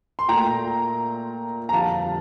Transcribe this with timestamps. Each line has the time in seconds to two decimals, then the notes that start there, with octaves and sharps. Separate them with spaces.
0.19 C6
0.29 A#2 A3 G5 A#5
1.69 A#5
1.73 F2 D3 G3 F5 A5